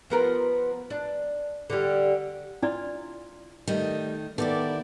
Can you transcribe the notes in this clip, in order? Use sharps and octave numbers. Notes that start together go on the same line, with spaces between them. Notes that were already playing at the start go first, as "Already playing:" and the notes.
F3 B3 A#4
D4
D3 G3
D4 E4 F4 D5
D#3 G3 A3 D#5
D#3 B3 E4 G4 A4 D5